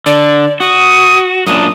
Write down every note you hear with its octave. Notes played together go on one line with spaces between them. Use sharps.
D3 D5
F#4 D#6
F#2 A#2 D4 D#6